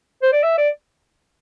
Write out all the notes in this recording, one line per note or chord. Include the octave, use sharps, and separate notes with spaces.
C5
D5
E5
D5